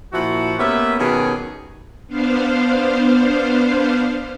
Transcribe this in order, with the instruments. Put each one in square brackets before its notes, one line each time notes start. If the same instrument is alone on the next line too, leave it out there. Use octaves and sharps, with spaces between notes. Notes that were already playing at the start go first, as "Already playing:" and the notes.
[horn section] A#2 F3 E4 F#4
A#3 B3 C#4 G4 B4 E5
B2 D#3 F#3 C#4 G4 G#4
[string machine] B3 D4 C5 F5